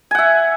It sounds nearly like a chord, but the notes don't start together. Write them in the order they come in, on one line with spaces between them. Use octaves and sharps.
G#5 F#5 E5